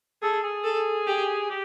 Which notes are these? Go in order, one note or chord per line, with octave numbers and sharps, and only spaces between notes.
G#4 A4
G#4
A4
G4
G4